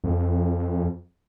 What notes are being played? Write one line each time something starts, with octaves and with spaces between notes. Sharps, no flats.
F2